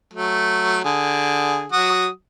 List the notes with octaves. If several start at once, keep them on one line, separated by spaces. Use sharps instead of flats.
F#3 A3
D3 G#4
F#3 F#4 D#6